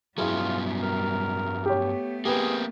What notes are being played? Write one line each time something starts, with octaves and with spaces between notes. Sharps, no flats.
G2 B2 F#3 G3 E4 F4 G#4
A#4
A3 B3 G4 C#5
A#3 C4 G4 G#4 B4